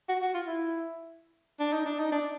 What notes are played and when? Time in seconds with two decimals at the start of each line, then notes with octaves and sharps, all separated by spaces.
0.09 F#4
0.22 F#4
0.34 F4
0.46 E4
1.60 D4
1.73 D#4
1.86 D4
1.99 D#4
2.12 D4